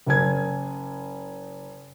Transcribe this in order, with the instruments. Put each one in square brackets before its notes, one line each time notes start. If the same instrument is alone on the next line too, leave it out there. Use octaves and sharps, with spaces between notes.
[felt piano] F#1 G#5 G#6